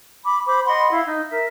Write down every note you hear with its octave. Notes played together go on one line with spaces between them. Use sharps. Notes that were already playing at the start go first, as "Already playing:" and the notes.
B5 D6
C5 B5 D6
D#5 F#5 B5 C6
E4 F5
D#4
A#4 E5